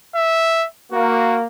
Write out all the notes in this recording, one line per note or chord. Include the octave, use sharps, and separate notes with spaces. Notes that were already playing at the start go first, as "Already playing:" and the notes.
E5
A#3 F#4